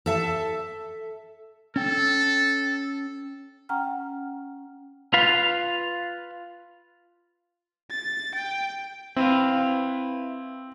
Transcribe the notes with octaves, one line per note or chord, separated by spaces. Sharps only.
A4 E5 F5 A5
C#4 A4 G5
C#4 F#5 G5 A#5 F6
F4 B4 F5
A6
G5
C4 E4 B4 F5